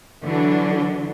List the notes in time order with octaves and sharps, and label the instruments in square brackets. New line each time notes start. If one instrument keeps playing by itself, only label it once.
[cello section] D3 E3 F#3 D4